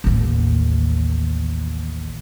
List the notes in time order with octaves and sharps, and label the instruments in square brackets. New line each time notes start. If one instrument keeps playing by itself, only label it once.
[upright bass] A1 D#2